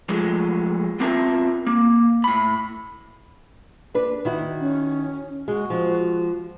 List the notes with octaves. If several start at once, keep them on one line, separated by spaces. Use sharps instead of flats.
F3 F#3 G#3 A3
B3 C4 F4 A#4 E5 A5
A#3
A2 B5
D4 B4
D#3 E4 F#4
C#4
G#3 F#4
F3 G#3